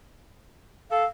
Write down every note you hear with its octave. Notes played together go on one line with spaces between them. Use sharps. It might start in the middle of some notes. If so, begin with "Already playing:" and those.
A4 F5